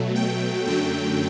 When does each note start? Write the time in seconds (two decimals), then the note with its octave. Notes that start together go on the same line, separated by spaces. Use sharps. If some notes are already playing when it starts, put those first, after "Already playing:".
Already playing: B2 F#3 A3
0.16 G5
0.67 F#2 D3 F#3 A3 G5